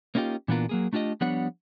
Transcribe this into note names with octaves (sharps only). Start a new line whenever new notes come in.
A#3 C#4 D#4 F4 G4
A#2 E3 B3 D4 F4 A#4
F#3 A#3 G#4
A3 D4 F4 G4 D#5
F3 G3 B3 D4 C#5 F#5